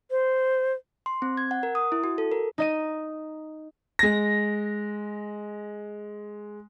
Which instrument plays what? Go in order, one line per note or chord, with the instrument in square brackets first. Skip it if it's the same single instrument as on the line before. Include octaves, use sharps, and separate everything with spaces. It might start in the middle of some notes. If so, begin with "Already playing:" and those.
[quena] C5
[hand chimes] C6
C4
G#6
F#5
A#4
D#6
E4
F#4
A4
A#4
[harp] D#4 D#5 D#7
[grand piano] G#3 A#6